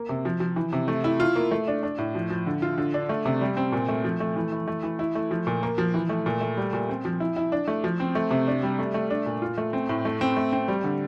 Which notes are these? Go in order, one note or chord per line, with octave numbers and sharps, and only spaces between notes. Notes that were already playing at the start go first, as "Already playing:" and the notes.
Already playing: A#3
C3
F3
F3
E3
C3
A3
E4
F4
A#3
A3
D4
D4
A2
F3
F3
D3
F4
D3
D4
A3
C3
G3
C4
A#2
A3
F3
A3
E3
E3
A3
E3
E4
A3
F3
A#2
A#3
F3
E3
A3
A#2
A3
G3
A#2
C4
F3
E4
E4
D4
A3
F3
C4
A3
C3
D4
G3
A3
A3
D4
A#2
F4
A3
C4
A2
A3
C4
A3
C4
G3
D3